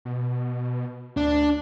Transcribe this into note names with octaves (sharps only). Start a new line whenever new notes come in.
B2
D2 D4